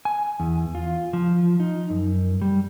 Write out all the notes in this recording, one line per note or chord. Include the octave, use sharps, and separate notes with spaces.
G#5
E2
F4
F3
D#4
F#2
G3